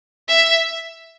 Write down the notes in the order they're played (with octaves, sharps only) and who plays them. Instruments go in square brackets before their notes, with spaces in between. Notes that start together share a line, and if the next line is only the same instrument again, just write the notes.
[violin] E5